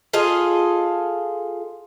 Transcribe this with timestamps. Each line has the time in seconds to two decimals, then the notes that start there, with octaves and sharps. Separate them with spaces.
0.13 F4 G#4 A4 D#5